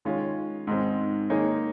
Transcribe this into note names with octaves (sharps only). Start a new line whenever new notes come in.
D#3 G#3 C#4 F4
G#2 D#3 G#3 C4
D#3 A#3 D#4 G#4 C#5